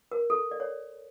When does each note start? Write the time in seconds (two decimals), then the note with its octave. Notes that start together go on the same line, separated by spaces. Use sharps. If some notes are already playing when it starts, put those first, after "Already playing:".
0.12 A#4
0.30 A4
0.51 D5
0.60 C#5